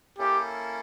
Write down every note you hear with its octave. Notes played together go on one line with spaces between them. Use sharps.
A#3 C#4 E4 G4 A4